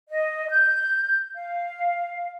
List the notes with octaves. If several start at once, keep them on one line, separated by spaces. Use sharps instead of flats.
D#5
G6
F5